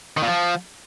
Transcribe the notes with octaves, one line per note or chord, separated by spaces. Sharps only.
D#3
A#2
F3